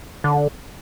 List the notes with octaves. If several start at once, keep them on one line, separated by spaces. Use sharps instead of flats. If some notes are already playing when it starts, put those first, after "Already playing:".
D3